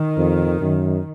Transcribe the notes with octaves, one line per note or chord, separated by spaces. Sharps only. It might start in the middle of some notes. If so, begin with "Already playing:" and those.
Already playing: D#3
F2
F#2